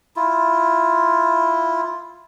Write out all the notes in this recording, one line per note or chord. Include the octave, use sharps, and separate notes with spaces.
E4 F4